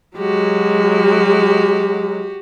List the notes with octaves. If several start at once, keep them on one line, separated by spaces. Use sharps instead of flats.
F#3 G#3 F#4 G4